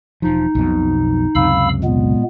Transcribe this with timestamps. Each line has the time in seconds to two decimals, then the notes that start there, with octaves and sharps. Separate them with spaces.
0.22 E1 F3 D#4
0.55 B1 F2 B2
1.35 C#2 F#2 C3 F5 B5 E6
1.84 A#2 G#3 B3